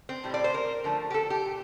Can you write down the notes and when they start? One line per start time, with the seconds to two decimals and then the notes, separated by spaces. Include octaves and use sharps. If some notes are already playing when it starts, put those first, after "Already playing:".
0.09 C4
0.24 A2 G3
0.34 D5
0.44 C5
0.54 A#4
0.84 D3 F3 A3
1.10 G4
1.14 A4
1.30 G4
1.45 A#2